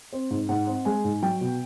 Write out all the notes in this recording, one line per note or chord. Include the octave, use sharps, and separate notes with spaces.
C4
G#2
G#2 F#5
C4
G#3 G#5
G#2
F#3 G5
B2